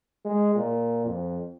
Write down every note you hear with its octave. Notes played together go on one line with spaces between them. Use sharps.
G#3
A#2
F2